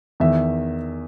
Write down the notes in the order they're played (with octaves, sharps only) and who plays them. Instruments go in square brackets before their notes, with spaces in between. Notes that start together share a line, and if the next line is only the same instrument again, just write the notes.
[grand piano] E2 D#3 E5